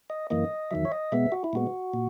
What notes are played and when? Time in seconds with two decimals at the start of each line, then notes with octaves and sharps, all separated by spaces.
0.10 D#5
0.30 F#2 E3 A#3 D#5
0.71 E2 D#3 F#3 E5
0.85 C#5
0.92 D#5
1.12 B2 G#3 B3 E5
1.32 F#4
1.44 E4
1.53 A#2 G#3 B3 F#4
1.94 A#2